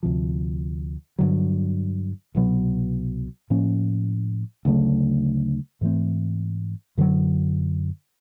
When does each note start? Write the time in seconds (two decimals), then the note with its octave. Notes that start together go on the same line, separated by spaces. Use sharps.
0.03 D2 C3 F3
1.19 G2 D3 F#3
2.35 C2 B2 F#3 B3
3.50 A2 F3 A#3 C#4
4.65 D2 C#3 F#3 A3
5.81 G#2 E3 A3 C4
6.98 F#2 D3 F#3